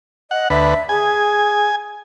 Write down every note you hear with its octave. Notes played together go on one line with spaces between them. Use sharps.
D#5 F#5
D2 B4 E5
G#4 G#5